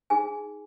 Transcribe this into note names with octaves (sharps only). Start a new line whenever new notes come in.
D#4 G#4 G#5